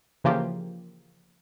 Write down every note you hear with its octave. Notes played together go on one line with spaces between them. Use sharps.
C#3 E3 F3 A#3 F4 G4